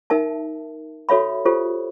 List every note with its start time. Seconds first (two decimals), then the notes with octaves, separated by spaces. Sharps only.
0.10 D#4 A#4 E5 A5
1.09 F#4 A4 C#5 E5 B5
1.45 F4 G4 A4 C5